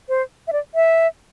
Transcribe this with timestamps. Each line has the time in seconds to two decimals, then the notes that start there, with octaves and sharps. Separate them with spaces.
0.09 C5
0.48 E5
0.53 D5
0.75 E5